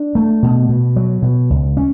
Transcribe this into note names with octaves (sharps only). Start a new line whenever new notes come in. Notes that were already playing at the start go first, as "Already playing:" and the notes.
Already playing: D4
A3
B2
B2
F#3
B2
C#2
C#4